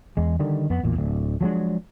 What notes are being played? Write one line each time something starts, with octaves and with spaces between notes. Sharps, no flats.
E2 G#3
D3 D#3 G3
F2 B3
A1 E2 A#2
D1 D2
F3 F#3 G#3 D4